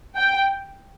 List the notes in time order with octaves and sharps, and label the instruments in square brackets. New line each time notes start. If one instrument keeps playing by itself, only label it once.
[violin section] G5